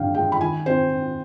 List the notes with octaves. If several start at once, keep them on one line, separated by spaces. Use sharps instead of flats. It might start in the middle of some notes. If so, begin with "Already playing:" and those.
Already playing: G2 D3 D4 F5 G5
G#3 G5
B5
D#3 G#5
C4 C5